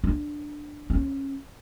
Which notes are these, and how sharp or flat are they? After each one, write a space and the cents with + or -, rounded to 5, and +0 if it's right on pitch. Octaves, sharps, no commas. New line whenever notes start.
D4 +10
C#4 -20